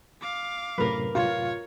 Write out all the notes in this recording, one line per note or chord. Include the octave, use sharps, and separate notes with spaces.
F5 D6
F#2 A2 C3 A#4 B4
F4 C#5